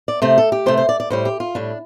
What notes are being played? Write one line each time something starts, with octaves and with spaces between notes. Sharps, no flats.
D5
C3 A3 C5
A4
G4
C3 A3 C5
C5
D5
D5
A2 G3 C5
G4
F4
A2 G3 D4